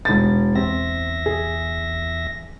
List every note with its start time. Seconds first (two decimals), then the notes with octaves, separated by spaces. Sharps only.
0.05 E1 A6
0.56 E2 C4 E5 A#6
1.26 G#4